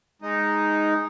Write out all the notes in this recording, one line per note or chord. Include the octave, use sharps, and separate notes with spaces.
G#3 D#4